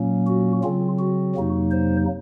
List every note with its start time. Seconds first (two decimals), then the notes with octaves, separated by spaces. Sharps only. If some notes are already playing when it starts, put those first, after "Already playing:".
Already playing: A#2 F#3 A#3 C#4
0.27 F#4
0.63 C#3 F#3 C4 F4
0.99 F#4
1.35 F2 C3 F#3 A#3 D#4
1.71 C5